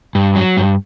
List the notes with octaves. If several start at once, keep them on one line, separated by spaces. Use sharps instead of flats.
G2
F#3
G2